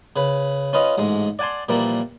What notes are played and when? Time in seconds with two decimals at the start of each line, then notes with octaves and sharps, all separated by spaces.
0.16 C#3 B4
0.73 C#4 F4 B4 D#5
0.98 A1 G#2 G#3
1.39 D5 F#5 G#5 A5 C6
1.69 A#2 E3 F3 G3 A#3